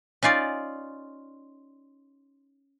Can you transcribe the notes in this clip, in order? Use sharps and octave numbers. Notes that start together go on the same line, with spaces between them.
C#4 D#4 F4 D5